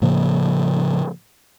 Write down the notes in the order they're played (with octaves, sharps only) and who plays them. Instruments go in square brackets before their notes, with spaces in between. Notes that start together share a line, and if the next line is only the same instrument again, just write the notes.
[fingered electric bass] A2 C#3 F3 A#3